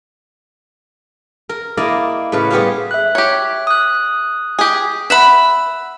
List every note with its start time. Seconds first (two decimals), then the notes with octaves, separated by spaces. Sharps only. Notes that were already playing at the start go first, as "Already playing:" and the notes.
1.49 A#4
1.77 A#3 E4 D5 D#5 F5
2.32 A2 C#3 B4 F5
2.50 G3 B3 G4 G#4 C5 F5
2.91 E5 F#6
3.15 G4 C#5
3.67 D#6 F#6
4.59 G4 G#4
5.10 E5 F#5 B5